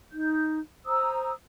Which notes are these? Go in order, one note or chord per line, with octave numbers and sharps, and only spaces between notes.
D#4 G6
C5 A#5 D#6 E6